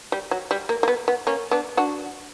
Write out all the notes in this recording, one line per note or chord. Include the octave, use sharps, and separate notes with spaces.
G3
F#3
G3
A#3
A#3
B3
B3
A#3 C#4
B3 D4
D4 F#4